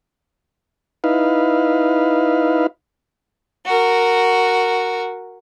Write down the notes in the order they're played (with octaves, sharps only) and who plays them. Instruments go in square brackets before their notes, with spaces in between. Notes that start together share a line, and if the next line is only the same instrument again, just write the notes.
[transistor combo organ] D#4 E4 B4 F5
[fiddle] F#4 A#4